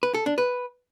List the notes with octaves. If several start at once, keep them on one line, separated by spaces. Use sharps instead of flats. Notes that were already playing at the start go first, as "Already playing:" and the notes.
B4
A4
D4
B4